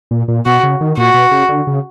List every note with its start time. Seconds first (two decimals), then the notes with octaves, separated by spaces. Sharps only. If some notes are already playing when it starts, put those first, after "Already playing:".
0.11 A#2
0.28 A#2
0.45 B2 F#4
0.63 C#3
0.81 D#3
0.97 A#2 F#4
1.14 B2
1.31 C#3
1.49 D3
1.67 C#3